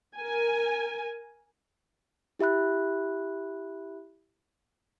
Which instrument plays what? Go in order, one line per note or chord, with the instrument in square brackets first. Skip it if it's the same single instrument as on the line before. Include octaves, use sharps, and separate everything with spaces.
[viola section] A#4 G#5
[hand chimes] E4 G4 E5 B5 F#6